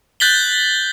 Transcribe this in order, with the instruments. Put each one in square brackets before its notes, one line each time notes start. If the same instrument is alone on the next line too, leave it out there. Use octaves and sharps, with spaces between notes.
[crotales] F#6 G6 A6 B6 F#7 G7